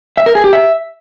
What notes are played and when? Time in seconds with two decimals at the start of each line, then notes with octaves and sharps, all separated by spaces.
0.17 E5
0.26 A#4
0.35 G#4
0.44 G4
0.53 E5